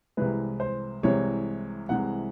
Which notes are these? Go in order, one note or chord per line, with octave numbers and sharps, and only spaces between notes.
C2 C3 E3 G#3 B4
C5
C2 C3 E3 G#3 C#5
C2 C3 E3 G#3 F#5